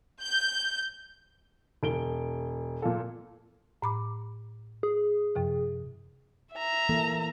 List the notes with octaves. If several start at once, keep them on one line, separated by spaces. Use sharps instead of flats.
G6
E1 D7 G7
A#2 F4 A4
A2 B5 D6
G#4
F#2 C3 F3
E5 A#5
E3 A#3 A4